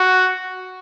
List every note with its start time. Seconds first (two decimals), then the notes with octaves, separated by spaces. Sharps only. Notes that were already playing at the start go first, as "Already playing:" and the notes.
Already playing: F#4